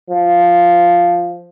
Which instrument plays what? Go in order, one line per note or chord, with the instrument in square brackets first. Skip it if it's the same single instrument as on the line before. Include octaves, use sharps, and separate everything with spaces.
[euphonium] F3